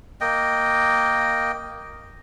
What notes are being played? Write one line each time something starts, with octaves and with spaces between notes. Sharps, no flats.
A#3 D#5 G5